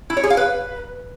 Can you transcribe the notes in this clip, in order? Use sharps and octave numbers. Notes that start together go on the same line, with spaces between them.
E4
C#5
G#4
F5
B4